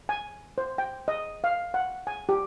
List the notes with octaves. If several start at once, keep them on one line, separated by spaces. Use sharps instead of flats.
G#5
C5
G5
D#5
F5
F#5
G#5
G4